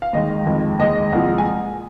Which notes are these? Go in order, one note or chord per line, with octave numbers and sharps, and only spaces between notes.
F5
D#2 D#3 G#3 D#5
F2 D#3 G#3
D#2 D#3 G#3 D#5
C2 A#2 F3 G#3
G#5